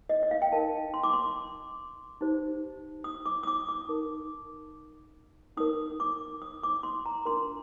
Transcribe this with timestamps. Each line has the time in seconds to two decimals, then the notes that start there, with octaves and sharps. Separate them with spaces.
0.09 D#5
0.23 D#5
0.31 F5
0.42 G5
0.52 D#4 A#4 A5
0.94 C6
1.03 D6
1.13 C6
2.21 D#4 G4 C5
3.04 D#6
3.26 D6
3.43 D#6
3.47 D6
3.69 D6
3.88 D#4 A#4
5.57 D#4 A#4 D#6
6.00 D6
6.42 D#6
6.63 D6
6.83 C6
7.06 A#5
7.25 D4 F4 A#4 C6